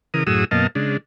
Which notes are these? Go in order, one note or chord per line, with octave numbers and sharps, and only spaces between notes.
C#3 E3 A#4 D#6
F#2 A2 F#4 G#4 D#6 E6
F#2 B2 A#3 D#5 F5 A5
C#3 G#3 D4